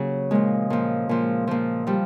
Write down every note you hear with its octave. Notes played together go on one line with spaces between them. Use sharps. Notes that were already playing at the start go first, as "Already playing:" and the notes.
Already playing: C#3 F#3 A#3
A#2 F3 G#3
A#2 F3
A#2 F3
A#2 F3
F3 G3